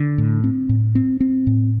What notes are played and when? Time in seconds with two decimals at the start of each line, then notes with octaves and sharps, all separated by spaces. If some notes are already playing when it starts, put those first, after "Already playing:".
Already playing: D3
0.18 A2
0.44 C4
0.69 A2
0.95 C4
1.20 C4
1.47 A2